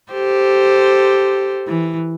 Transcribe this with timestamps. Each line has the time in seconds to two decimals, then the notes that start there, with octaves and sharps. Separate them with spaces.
0.12 G4 A4 C5
1.67 E3